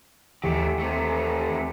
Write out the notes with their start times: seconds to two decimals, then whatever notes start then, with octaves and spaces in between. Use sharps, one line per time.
0.44 D#2 E3 A3 G4
0.80 C3 A3